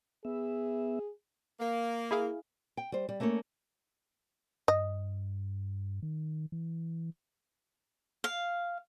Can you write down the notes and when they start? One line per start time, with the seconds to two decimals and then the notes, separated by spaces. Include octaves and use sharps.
0.25 B3 G#4 E5
1.60 A#3
2.11 E4 G#4 F5
2.77 G5
2.92 G3 C5
3.09 G3
3.20 A3 A#3 C#4 A4 C#5
4.68 G2 D#5
6.03 D#3
6.52 E3
8.24 F5